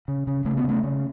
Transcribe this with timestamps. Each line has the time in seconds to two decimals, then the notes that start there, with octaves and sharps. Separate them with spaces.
0.08 C#3
0.27 C#3
0.45 C#3 A3
0.57 B3
0.64 C#3 A3
0.83 C#3